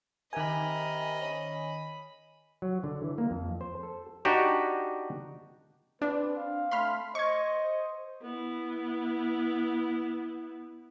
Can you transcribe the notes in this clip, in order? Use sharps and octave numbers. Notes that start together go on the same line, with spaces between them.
C3 D#3 A#4 D#5 G#5 B5
C#4 B5
F#3
D3
E3
A#3
F2
C5
A4
D4 D#4 F#4 G4
C4 D4 B4
F5
A3 B5 C6 F6
C5 D#5 C#6 G#6
C5
B3 E4